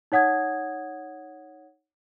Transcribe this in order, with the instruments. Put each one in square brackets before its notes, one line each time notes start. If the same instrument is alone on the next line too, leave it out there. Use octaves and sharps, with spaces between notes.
[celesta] D#4 C#5 F#5 D#6 G#6